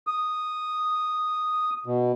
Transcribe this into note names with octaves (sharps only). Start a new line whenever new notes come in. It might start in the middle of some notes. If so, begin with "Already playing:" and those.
D#6
B2